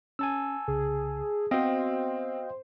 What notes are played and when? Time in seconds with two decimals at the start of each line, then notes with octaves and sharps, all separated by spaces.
0.19 C#4 G#5 A5 E6
0.68 C2 C#3 G#4
1.51 B3 C4 F#4 C5 D#5 F5 G5